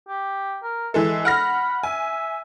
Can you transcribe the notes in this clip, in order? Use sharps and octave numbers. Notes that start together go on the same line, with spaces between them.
G4
A#4
E3 G#3 A4 E5
F#5 B5 F6 A#6
E5 G#5